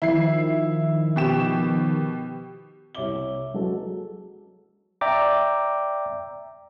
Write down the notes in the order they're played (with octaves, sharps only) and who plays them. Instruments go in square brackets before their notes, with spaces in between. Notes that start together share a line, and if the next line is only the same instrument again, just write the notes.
[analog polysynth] D#3 F3 [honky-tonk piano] E4 C7
[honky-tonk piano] B2 G4 E7
[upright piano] C2 C#5 E5 D6 G7
F#3 G#3 A4
[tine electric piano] D5 E5 G5 A#5 D6